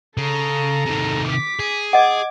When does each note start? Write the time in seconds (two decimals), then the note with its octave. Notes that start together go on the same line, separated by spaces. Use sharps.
0.18 C#3 A4 A#5
0.86 C3 D#3
1.28 D6 B6
1.60 G#4
1.93 D#5 F#5 D6 G#6